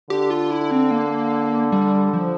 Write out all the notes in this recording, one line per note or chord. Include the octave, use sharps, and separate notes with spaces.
D3 G4
F4
E4
C4
A#3
G3
F3